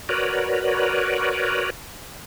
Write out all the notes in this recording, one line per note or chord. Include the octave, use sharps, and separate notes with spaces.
F#4 A#4 B4 C#5 D5